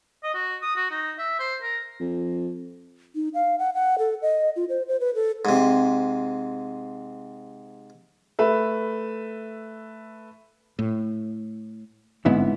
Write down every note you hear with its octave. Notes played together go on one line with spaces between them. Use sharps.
D#5
F#4
D#6
F#4
D#4
E5
C5
A#4
F2
D#4
F5
F#5
F#5
A4
D#5
F4
C5
C5
B4
A4
G#2 C3
A3 B4 E5
A2
G1 G#2 D3 B3 C4 E4